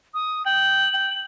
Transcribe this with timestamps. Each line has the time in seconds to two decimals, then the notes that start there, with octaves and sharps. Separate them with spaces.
0.14 D#6
0.46 G5 F#7
0.93 G5